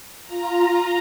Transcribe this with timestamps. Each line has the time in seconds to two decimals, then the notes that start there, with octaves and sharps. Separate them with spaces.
0.24 F4 A#5